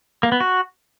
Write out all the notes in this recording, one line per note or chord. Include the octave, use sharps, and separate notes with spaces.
A#3
B3
F#4